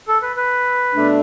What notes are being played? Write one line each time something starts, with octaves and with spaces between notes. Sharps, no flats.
A4
B4
B4
B2 A3 D4